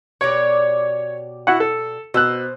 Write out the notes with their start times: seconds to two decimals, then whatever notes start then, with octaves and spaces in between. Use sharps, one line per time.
0.21 B2 G4 C#5 D5
1.47 E4 F#4 F#5
1.60 A4
2.14 B2 C5 E6 F#6